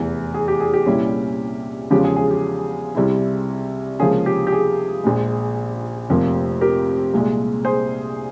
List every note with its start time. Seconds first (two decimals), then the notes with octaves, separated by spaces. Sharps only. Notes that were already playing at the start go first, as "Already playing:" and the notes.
Already playing: F1 E2 E3
0.34 G#4
0.48 G4
0.60 G#4
0.74 G4
0.86 C2 A#2 G3 C#4 E4
1.90 E2 C#3 F3 G#3 C#4 G4
2.04 G#4
2.16 G#4
2.31 G4
2.95 C2 C3 G3 C4 E4
4.00 C#2 C3 F3 A#3 C#4 G#4
4.26 G4
4.47 G4
4.53 G#4
5.04 A#1 A#2 G#3
6.09 F1 F2 C3 F3 A#3
6.61 G4 A#4
7.14 C2 A#2 G#3
7.65 G#4 C5